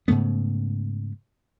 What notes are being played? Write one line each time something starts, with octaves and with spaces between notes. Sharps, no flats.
G#2 C#3 A3 B3